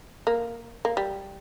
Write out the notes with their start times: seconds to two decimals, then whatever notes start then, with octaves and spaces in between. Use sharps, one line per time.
0.27 A#3
0.85 A#3
0.97 G3